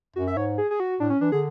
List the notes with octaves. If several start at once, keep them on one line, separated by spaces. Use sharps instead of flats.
F#2 F#4
E5
G#2 C#5
G#4
G#4
F#4
A2 D4
C#4
E3 D4
D3 G#4